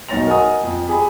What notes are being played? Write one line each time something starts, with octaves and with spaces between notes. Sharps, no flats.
B1 D#4 C#5 A6 A#6 F7
A#4 D#5 F#5 G#5 D#6
F2
G4 G#4 G#5 B5